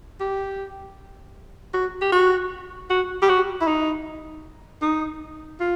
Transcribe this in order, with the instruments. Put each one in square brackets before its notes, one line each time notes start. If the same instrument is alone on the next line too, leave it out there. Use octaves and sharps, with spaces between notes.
[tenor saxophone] G4
F#4
G4
F#4
F#4
G4
F#4
E4
D#4
D#4
F4